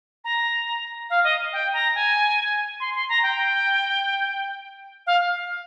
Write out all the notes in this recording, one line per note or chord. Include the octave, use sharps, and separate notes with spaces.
A#5
F5
D#5
G5
A#5
G#5
C6
C6
A#5
G5
F5